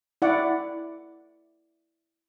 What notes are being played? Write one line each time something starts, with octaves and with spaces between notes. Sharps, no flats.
E4 D5 F#5